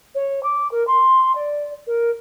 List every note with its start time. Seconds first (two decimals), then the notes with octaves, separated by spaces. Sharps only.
0.14 C#5
0.43 D6
0.71 A#4
0.87 C6
1.35 D5
1.86 A#4